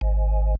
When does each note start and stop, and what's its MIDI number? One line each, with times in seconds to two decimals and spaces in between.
0.01 0.55 32